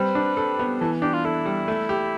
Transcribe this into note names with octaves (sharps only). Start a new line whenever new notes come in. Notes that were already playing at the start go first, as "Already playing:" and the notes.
Already playing: G3 C4 B4
D4
A4
B3
E3 A4
D4 G4
F4
E4 A4
G3
A3
G4